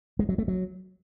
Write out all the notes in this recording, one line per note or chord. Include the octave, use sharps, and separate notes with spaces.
G#3
F#3
A3
F#3